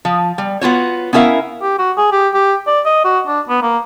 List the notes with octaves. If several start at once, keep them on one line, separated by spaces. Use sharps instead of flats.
F3
G3
B3 F4 F#4 C#5
B3 C#4 E4 A#4 E5 F5
G4
F#4
G#4
G4
G4
D5
D#5
F#4
D4
B3
A#3